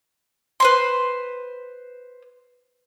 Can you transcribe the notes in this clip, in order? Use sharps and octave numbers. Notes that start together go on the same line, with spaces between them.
B4 C5 C6